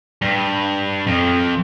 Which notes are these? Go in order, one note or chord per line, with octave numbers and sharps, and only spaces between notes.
G2
F2